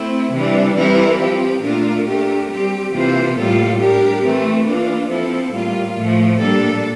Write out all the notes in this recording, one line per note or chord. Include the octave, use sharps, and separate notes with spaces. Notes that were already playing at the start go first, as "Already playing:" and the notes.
Already playing: A3 C4 E4
C3 E3 G3 D4
E3 G3 C4 E4 A#4
F3 C4 G4
A#2 A3 D4 F4 A#4
A3 D4 G4 A#4
G3 C4 G4
C3 E3 A#3 F4 C5
A2 G3 A#3 F4 A4
G3 D4 G4 A#4
E3 A3 C4
E3 A#3 D4 F4
F3 C4 E4 A4
A2 G3 A#3 F4
A2 F3 A3
A#2 G3 A#3 D4 A4